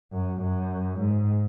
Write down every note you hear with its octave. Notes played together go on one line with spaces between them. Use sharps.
F#2
F#2
G#2